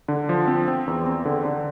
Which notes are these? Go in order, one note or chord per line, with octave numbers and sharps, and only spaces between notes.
D3
F3
C4
C4
E2
C4
D3
D3